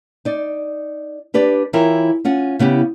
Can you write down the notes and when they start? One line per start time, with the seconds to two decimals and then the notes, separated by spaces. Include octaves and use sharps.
0.25 D#4 D5
1.34 D4 G4 B4 D5
1.73 E3 E4 F4 A#4 C#5 G5
2.25 C#4 F4 F#5
2.59 C#3 B3 E4 G4